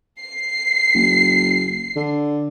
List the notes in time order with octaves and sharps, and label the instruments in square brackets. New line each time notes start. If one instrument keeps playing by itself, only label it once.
[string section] C7
[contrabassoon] F#1
D3